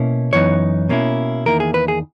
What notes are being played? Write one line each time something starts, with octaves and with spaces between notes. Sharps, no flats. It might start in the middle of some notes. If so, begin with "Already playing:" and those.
Already playing: B2 A#3 C#4 E4
F#2 E3 B3 D#4 C#5
B2 A#3 C#4 E4
E2 D#3 A#3 E4 A#4
G#4
B4
G#4